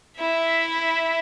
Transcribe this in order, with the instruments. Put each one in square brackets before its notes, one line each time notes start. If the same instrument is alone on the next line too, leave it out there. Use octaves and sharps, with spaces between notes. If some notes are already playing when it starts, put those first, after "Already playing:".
[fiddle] E4 E5